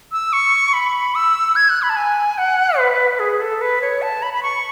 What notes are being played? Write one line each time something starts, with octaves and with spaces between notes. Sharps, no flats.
E6
C#6
B5
E6
G#6
F#6
B5
A5
G#5
F#5
B4
G#4
A4
B4
C#5
A5
B5
B5
C#6